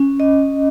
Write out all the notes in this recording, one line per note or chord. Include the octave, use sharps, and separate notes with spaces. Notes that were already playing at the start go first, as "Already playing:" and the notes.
Already playing: C#4
D#5